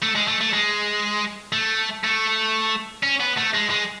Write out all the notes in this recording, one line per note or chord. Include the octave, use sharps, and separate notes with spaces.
A3
G#3
A3
A3
G#3
A3
A3
C#4
B3
A3
G#3
G#3